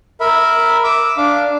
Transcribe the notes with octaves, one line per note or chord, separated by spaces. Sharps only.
A#4 E5 B5
D6 E6
D4 F5 D6